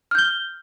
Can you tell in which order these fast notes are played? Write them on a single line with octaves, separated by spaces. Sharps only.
F6 G6 G7